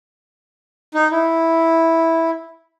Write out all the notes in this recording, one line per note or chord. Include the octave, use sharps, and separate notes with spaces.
D#4
E4